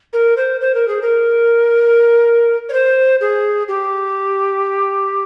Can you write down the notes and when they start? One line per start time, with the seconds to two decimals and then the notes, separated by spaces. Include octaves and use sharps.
0.13 A#4
0.36 C5
0.60 C5
0.74 A#4
0.87 G#4
1.02 A#4
2.69 C#5
2.73 C5
3.20 G#4
3.68 G4